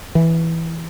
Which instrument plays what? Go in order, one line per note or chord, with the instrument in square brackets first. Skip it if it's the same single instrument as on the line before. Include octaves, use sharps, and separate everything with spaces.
[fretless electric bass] E3